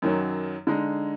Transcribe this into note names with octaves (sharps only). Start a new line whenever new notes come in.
F#2 D#3 F#3
D3 G#3 D#4